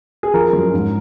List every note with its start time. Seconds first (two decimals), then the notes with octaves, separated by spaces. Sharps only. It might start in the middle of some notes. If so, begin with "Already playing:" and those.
0.23 G#4
0.34 F3 A#4
0.53 F#2
0.74 G#2